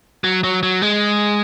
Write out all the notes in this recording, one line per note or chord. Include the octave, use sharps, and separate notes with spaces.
F#3
F#3
F#3
G#3